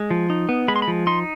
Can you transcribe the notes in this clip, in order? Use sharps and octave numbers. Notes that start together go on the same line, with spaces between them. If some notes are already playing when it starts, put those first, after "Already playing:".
Already playing: G#3
F3
D#4
B3
G#3 B5
C6
B5
F3
D#4 C6